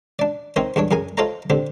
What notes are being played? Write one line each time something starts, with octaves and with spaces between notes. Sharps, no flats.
D4 D5
C4 D#4 A#4 C5 C#5
E2 G2 D4 C#5
F#2 G#4 A#4 G#5
F4 A4 C5 C#5 D#5 A#5
D3 C4 G4